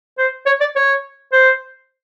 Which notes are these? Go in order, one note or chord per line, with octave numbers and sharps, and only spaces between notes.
C5
C#5
D5
C#5
C5